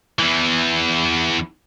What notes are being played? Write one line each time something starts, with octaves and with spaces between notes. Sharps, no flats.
E2 E3